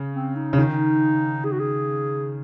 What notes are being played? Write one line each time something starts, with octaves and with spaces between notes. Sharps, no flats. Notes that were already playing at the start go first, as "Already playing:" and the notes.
Already playing: C#3
C4
D#4
C#3
D#3 D#4
G#4
F#4
G#4